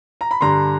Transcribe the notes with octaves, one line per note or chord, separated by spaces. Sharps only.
A#5
B5
G2 D3 G3 A#5 C6